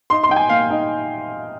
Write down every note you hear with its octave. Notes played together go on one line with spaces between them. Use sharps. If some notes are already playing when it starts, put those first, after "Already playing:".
D#4 C6
C6
D#4 G5
G#5
A#3 F5
D#4